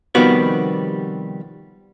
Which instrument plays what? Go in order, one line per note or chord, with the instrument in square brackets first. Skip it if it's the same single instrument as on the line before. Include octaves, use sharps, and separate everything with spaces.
[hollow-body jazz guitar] C3 D#3 F3 G3 B3 F#4